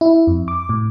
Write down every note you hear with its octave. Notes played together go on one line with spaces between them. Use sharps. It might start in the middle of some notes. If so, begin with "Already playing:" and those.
E4
F2
D6
A2